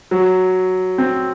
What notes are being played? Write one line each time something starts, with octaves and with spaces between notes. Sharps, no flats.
F#3
C4